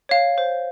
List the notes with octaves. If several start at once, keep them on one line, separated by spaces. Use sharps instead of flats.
C#5 F5
C5